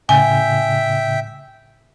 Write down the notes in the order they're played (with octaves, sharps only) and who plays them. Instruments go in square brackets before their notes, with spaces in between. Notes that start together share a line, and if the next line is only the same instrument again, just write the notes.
[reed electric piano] A2 C#3 [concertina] E5 G5 [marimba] G#5